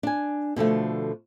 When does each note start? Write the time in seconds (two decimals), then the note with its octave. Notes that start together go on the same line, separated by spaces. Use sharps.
0.03 D4 G#5
0.56 B2 D3 F3 A3